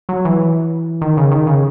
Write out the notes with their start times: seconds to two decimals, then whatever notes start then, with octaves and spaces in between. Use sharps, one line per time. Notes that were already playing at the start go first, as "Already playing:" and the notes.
0.09 F#3
0.25 E3
1.01 D#3
1.17 C#3
1.32 D#3
1.47 C#3